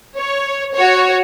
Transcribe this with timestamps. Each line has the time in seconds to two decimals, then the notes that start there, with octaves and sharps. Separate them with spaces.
0.18 C#5
0.74 F#4 C#5